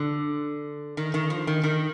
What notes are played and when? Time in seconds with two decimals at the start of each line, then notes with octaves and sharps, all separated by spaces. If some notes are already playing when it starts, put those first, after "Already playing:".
Already playing: D3
0.97 D#3
1.14 D#3
1.30 F3
1.47 D#3
1.63 D#3